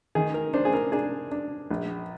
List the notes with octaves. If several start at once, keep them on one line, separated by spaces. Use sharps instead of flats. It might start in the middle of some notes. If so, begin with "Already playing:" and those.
D#3 G#4
A#4
D4 C5
G#4
A#4
D4 G#4
D4
A#1